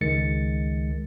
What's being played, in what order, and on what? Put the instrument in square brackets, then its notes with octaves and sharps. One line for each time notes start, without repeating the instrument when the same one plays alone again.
[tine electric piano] C#2 D#3 G#3 A6 C#7